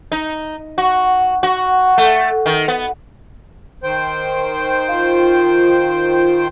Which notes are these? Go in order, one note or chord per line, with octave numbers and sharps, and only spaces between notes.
D#4
F#4
F#4
A3
D#3
B3
D#3 C5 G5
F4